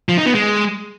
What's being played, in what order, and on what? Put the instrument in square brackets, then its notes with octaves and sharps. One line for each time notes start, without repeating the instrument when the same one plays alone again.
[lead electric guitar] F3
D#4
B3
G#3